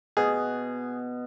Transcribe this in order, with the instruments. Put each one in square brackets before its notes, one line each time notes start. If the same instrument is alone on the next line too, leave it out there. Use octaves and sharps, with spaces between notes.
[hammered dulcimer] B2 [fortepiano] G#4